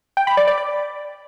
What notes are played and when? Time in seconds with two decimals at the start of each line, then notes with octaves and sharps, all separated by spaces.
0.17 G5
0.27 B5
0.37 D5
0.48 D5
0.58 D5